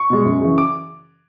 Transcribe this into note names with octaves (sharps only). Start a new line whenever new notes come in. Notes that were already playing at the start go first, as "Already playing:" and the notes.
Already playing: C#6
B2 G#3
F#2
C#3 E3
D6